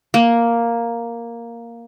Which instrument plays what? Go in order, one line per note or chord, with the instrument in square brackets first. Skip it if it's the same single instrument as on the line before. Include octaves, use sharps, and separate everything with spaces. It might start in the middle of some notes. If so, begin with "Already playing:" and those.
[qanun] A#3